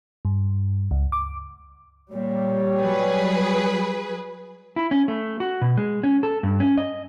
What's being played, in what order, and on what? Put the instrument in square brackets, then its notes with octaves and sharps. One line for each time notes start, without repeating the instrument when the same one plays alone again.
[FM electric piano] G2
C#2
D6
[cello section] A#2 [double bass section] G3 [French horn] C#5
[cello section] F#3 [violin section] G#4 B4
[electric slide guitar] E4
C#4
A3
F#4
B2
G#3
C#4
A4
G2
C#4
D#5